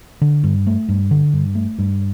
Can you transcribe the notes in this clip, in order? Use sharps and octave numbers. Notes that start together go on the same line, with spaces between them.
D3
G2
A3
G2
D3
G2
A3
G2